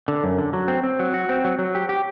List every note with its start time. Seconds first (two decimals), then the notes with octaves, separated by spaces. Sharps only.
0.08 D3
0.24 F#2
0.38 D3
0.53 F#3
0.68 C4
0.83 C4
0.99 F#3
1.14 F#4
1.29 C4
1.44 F#3
1.59 F#3
1.75 G4
1.89 G4